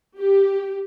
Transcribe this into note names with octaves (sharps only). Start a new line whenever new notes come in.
G4